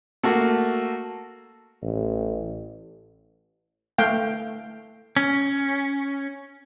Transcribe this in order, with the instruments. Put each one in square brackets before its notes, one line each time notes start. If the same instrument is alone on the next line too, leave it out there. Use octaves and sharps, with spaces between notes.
[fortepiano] A3 A#3 F#4
[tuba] A1
[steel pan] A3 F5 G5
[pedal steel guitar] C#4